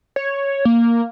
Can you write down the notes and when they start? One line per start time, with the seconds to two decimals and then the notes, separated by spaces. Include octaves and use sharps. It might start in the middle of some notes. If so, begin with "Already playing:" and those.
0.16 C#5
0.65 A#3